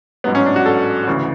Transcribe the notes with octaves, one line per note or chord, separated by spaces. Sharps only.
A1 G#2 F#3 B3
C#4
D4
F#4
A4
D2 C#3 E3